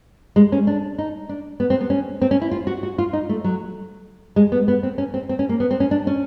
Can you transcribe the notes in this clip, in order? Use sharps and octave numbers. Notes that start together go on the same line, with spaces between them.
G#3
C#4
D4
D#4
D4
B3
C4
B3
C#4
C4
C#4
E4
F4
F#4
F#4
F4
D#4
A3
F#3
G#3
B3
B3
C4
C#4
C4
C4
C#4
A#3
B3
C4
C#4
D4
C#4